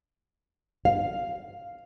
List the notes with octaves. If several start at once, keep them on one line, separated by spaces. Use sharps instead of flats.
F5